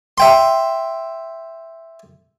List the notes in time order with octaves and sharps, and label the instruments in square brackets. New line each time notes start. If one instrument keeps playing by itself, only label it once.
[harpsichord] E5 G5 C6